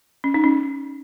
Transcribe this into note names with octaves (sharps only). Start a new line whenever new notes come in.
C#4
D#4
C#4